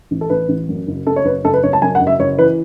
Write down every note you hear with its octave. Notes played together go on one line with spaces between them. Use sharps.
A1
A4
A1 B4
A1
F#2
F#1
C#3 A4
C#5
F#1 B4
F#1 A4
B4
F#1 C#5
A5
F#2 G#5
F#5
F#1
E5
F#1 C#5
E3 B4